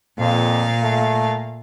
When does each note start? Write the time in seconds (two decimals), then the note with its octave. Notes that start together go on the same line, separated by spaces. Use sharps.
0.18 F2 A#2 F5
0.80 A3